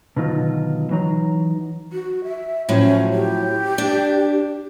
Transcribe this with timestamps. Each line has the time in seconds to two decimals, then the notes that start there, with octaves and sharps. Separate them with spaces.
0.17 B2 D3 D#3 F#3 D#4 F4
0.90 E3 F#3 D#4 A#5
1.93 F#4
2.24 E5
2.69 A2 F3 F#3 C#4
3.13 G4
3.78 D4